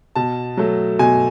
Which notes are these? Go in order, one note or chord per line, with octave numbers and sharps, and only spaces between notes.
B2 A5
F#3 A3
B2 G#5